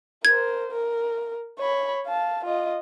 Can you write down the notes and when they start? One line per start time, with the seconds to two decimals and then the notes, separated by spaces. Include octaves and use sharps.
0.25 A#4 C5 G#6
0.71 A#4
1.58 C#5 B5
2.07 F5 A5
2.45 F4 D#5